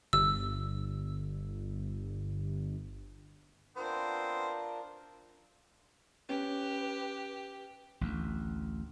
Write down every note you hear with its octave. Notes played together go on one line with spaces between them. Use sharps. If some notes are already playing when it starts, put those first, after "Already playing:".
G1 E6
B3 C4 D4 F4 A#4 C5
C#4 G4 B4
A1 D2